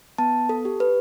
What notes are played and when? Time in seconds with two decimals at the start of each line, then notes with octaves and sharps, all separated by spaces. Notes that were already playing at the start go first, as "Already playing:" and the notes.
0.18 B3 A5
0.49 A4
0.65 G4
0.80 B4